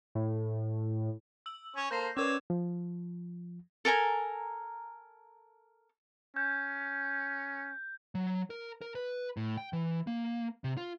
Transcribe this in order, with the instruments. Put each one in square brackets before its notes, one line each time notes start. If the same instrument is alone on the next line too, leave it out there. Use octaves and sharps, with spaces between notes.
[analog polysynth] A2
[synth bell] E6 F#7
[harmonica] C#4 C#5
[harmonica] A#3 A4 C5 [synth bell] G6 A#6 C7
[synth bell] C#4 A#4 B4 [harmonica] C#5 D5 E6
[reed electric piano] F3
[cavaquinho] A4 A#4 G#5 A#5
[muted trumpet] C#4 [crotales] G6
[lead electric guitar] F#3
A#4
A#4
B4
A2
G5
E3
A#3
C3
F4